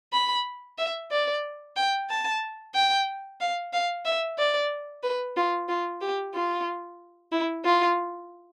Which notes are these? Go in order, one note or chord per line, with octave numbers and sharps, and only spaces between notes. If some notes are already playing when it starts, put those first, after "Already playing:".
B5
E5
D5
G5
A5
G5
F5
F5
E5
D5
B4
F4
F4
G4
F4
E4
F4